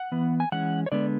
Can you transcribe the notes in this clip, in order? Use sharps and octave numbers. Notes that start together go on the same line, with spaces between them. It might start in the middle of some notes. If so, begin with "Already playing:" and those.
Already playing: F#5
E3 B3
G#5
E3 G#3 C#4 F#5
C#5
D3 G#3 B3 D5